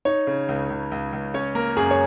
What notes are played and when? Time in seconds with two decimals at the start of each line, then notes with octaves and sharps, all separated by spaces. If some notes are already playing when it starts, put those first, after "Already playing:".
0.05 D#4 C#5
0.27 C#3
0.48 C#2
0.70 C#2
0.91 C#2
1.13 C#2
1.34 C#4 C#5
1.55 A#3 A#4
1.77 F#2 G#4
1.91 C#5